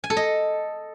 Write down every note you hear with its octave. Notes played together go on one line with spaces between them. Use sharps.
G#5
A4
D#5